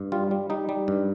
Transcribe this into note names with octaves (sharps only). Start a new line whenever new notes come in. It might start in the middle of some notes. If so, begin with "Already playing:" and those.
Already playing: G2
G3 F4
G3
G3 D#4
G3
G2